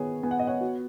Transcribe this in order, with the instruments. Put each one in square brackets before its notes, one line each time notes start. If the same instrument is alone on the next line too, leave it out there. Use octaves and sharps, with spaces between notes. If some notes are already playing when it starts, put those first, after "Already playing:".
Already playing: [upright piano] D#3 B3 [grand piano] G#4 C#5
[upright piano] B3 [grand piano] G#5
[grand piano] F#5
D#5
C#5 F#5
[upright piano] F#4